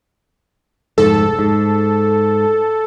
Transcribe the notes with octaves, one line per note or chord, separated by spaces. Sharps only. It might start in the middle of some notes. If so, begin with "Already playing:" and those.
F1 G#2 A4
G#2